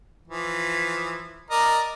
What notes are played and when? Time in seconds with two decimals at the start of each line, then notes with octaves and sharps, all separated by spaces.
0.28 E3 F3
1.50 A#4 D5 D#5